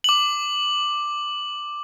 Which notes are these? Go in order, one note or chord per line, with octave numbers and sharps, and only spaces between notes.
D6 F#7